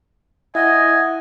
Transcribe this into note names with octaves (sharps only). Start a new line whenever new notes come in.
E4 D#5 E5 F#5 G#5